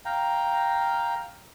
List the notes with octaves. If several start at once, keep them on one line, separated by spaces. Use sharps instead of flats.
F5 G5 A#5